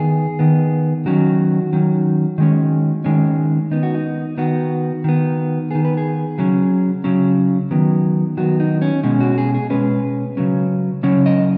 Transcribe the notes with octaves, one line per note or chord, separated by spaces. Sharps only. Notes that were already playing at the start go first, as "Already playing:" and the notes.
Already playing: D#3 B3 G#4
D#3 B3
D#3 F#3 C#4 F#4
D#3 F#3 C#4
D#3 G#3 C#4
D#3 G#3 C#4
D#3 B3 D#4
F#4
D#4
D#3 B3 F#4
D#3 B3
D#3 B3 G#4
B4
G#4
C#3 F#3 C#4
C#3 F#3 C#4
D#3 F#3 B3
D#3 F#3 B3 F#4
D#4
C#4
B2 G#3 C#4
F#4
G#4
G#4
B2 G#3 C#4 B4
C#3 F#3 C#4
C#3 F#3 C#4 C#5
D#5